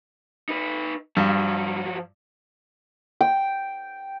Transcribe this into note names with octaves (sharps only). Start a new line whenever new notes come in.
D#4 B4
G2 F3 F#3
G5